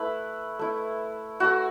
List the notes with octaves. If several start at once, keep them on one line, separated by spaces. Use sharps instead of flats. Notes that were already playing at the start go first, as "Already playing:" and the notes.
Already playing: A3 E4 B4
A3 E4
A3 E4 F#4